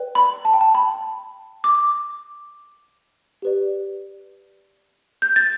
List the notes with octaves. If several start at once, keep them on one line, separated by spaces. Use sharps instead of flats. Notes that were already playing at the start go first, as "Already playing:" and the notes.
Already playing: B4 D5 G5
B5
A5
G5
A5
B5
D6
G4 B4 D5
G6
A6